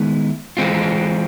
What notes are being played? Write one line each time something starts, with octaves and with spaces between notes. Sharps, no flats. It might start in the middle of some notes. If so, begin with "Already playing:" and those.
Already playing: D#3 G#3 B3 E4
E3 G#3 C4 F4